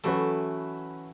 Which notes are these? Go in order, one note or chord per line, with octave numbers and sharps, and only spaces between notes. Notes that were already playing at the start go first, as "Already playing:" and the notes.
E3 F#3 A3 C#4 F#4 B4